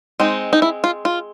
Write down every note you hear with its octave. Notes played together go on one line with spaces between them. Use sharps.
G#3 C4 D#4
D#4
E4
F4
F4